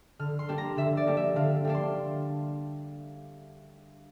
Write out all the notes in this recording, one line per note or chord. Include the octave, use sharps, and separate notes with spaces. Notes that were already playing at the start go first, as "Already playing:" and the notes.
D3 F6
C6
G3 A#3 D4
A#5
D3 E5
D5
G3 A#3 D4
E5
D3 F5
G3 A#3 D4
C6